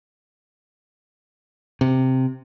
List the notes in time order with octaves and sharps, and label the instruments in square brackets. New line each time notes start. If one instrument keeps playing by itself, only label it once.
[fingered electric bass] C3